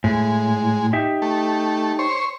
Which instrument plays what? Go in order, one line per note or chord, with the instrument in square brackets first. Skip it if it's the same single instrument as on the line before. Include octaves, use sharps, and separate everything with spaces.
[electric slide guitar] A2 [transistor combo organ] G#3
[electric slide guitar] D#4 G4 E5
[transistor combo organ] A3
C5 C#5